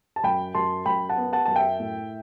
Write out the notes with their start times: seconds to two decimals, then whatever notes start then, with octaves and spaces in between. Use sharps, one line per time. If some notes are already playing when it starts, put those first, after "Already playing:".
0.16 A5
0.23 F#2 G5 B5
0.55 F#2 A5 C6
0.86 F#2 G5 B5
1.09 F#5 A5
1.17 B3
1.33 F#5 A5
1.46 F#2 A5
1.56 E5 G5
1.80 A2